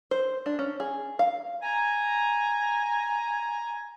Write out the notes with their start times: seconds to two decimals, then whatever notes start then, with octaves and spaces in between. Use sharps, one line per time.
0.11 C5
0.46 D4
0.59 C#4
0.80 G#4
1.19 F5
1.63 G#5 A#5